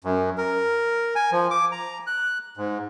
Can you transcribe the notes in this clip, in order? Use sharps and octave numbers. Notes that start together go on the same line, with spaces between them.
F#2
A#4
G#5
F3
D6
A#5
F#6
G#2